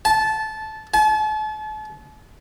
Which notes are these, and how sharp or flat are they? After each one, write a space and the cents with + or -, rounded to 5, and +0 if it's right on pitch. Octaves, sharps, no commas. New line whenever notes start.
A5 -15
A5 -40